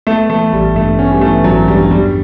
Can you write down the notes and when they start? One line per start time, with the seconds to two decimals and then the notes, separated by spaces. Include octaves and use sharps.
0.07 A3 B3
0.30 E3 A3
0.52 A1 G3
0.75 G2 A3
0.98 B3 C#4
1.12 G3
1.21 E3 A3
1.44 A1 F#3
1.67 G2 G3
1.90 E2 G3